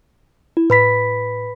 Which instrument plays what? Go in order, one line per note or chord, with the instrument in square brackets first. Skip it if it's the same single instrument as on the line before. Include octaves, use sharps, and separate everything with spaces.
[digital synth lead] E4
[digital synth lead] A2 [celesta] B4 B5 B6